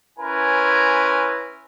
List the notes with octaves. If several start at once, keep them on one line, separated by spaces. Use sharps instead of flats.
C#4 E4 A#4 B4 G#5 C6